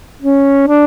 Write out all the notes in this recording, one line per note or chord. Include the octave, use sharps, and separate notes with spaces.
C#4
D4